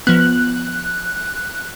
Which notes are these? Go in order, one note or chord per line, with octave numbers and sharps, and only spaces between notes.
F3 B3 F#6